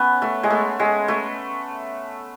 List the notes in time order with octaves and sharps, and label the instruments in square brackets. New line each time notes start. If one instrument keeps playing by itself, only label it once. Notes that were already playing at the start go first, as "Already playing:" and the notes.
Already playing: [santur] B3 C#4
A3
G#3
A3
G#3
A3